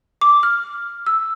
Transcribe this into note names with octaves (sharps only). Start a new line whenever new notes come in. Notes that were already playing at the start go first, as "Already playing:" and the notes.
D6
F6
E6